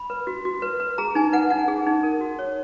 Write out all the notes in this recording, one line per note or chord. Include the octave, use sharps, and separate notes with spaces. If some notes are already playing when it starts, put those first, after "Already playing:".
Already playing: B5
B4
F#4
F#4
B4
B4
G#4 A#5
D#4 G#5
B4 F#5
D#4 F#5
G#4
D#4
A#4
F#4
C#5